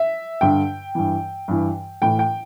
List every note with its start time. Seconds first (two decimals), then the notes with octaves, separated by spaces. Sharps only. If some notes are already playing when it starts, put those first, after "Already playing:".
Already playing: E5
0.41 G2 D3 G5
0.95 G2 E3
1.48 G2 E3
2.02 A2 E3 G5
2.19 G5